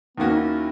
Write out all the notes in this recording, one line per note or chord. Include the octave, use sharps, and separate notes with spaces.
D#2 D#3 A#3 B3 C#4 F#4
D#4
E4